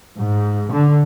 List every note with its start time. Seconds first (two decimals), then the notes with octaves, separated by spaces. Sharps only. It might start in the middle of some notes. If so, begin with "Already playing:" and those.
0.18 G#2
0.73 D3